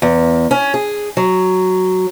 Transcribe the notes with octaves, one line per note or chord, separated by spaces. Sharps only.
E2
C#4
G#4
F#3